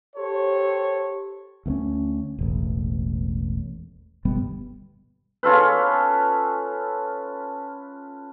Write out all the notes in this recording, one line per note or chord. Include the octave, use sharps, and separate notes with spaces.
G4 A4 C5 C#5 A5
D2 A#3 C#4
E1 A1
G1 B2 G3 B3
C#4 F4 A4 B4